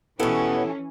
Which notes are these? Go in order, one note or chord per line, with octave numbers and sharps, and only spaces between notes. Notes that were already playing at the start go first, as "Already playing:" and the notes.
B2 E3 B3 C#4 E4 G4 A4